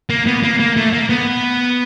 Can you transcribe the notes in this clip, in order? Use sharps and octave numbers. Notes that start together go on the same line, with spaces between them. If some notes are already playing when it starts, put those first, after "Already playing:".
A#3
B3
A#3
A#3
A3
A#3
B3